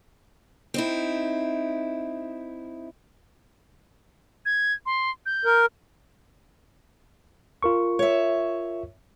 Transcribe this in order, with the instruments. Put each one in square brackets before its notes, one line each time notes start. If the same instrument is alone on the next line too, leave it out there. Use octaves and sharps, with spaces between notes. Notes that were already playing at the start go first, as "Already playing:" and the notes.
[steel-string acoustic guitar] C4 D#4 E4
[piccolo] G#6
C6
G6
[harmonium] A#4
[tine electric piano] F4 A#4 C#6
[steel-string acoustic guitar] C#5 E5